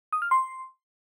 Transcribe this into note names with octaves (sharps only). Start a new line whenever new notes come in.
D#6
F6
C6